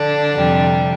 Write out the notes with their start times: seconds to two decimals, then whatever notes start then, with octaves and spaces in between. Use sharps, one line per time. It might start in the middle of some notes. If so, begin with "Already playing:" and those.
Already playing: D3 D4
0.32 F2 C3 G3